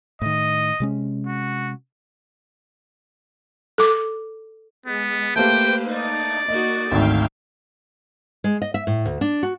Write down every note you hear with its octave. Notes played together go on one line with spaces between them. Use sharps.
A2 D#3 D#5
C3 G#3 C#4
F#4
A4 D6
G#3 B3
A3 A#3 G4 B4 C5 G5
D#4 D5
A#3 D#4 F#4 D#5
G#1 D2 D#3 E5 F5 G5
G#3
D#5
E5
A2
D2
D4
F#4